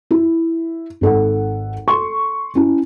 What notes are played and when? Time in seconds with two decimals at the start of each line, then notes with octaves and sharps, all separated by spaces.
0.11 E4
1.01 G#1 A4 F#5
1.88 A4 C6 C#6
2.55 C#4 E4